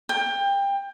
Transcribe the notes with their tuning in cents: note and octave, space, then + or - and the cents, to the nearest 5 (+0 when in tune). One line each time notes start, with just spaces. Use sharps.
G5 +25